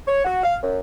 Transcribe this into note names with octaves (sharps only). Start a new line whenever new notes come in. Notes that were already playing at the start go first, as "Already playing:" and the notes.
C#5
F#4
F5
F#2